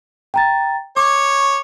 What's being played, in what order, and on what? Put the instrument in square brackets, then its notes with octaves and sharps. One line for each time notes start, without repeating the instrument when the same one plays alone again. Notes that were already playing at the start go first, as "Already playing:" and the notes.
[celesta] G5 A#5 A6
[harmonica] C#5 [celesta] D6